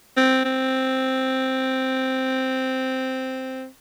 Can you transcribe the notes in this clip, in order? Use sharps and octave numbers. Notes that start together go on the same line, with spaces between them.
C4
C4